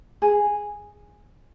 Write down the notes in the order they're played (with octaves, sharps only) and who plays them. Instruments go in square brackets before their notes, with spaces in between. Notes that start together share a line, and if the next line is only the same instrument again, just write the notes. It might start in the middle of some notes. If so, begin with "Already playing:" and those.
[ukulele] G#4